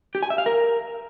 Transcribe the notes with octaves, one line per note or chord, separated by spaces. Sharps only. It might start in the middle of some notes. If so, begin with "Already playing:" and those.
G4
G#5
E5
F5
A#4